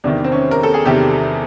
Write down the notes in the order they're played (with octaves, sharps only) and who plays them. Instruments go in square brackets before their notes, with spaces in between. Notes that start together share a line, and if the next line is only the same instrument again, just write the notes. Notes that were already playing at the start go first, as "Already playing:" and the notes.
[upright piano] E2 C3 D#3 D4
C4
C#4
A#4
A4
G#4
E2 C3 D#3 G4